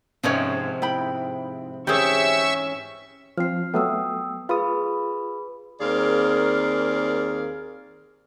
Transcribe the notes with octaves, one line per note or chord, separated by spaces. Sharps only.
G#2 C3 F3 C#4 C#5
E4 G5 B5
E3 C#4 G4 G#4 C5 E5 C#6 E6
F3 C4 F6 C7
F#3 A3 B3 G5 D#6 E6
F4 G#4 B4 B5 D#6
D#2 C4 G#4 A#4 D5 F5